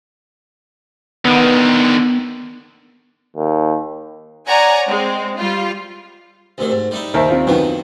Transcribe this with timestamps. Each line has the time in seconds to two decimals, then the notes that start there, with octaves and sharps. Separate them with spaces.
1.25 D3 D#3 B3
3.37 D#2
4.48 C#5 D5 F#5 G#5 A#5
4.88 G#3 C4
5.38 G3 F4
6.58 D2 C3 D#3
6.71 G#2
6.91 G3 D#4 E4
7.14 D#2 A#4 C5 E5
7.31 C4 F4
7.47 F#2 B2 D#3 F#3 B3